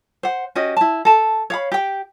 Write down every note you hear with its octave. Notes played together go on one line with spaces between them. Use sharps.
C5 F#5
C#4 F#4 G4 D#5
E4 A5
A4 A5
C#5 F5 B5
G4 G5